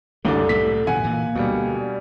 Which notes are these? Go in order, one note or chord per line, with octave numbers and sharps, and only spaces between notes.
C2 F#2 D3 D#3 D4 A4 D5
A2 G3 B6
B2 D#3 E3 F#5 G#5
A#2 E3 A#3
D2 B2 G3
D5